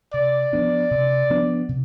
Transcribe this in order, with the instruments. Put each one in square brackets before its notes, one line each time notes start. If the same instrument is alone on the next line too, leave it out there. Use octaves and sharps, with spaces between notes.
[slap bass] C3 [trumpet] D5
[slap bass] F3 B3 D4
C3
F3 B3 D4
C3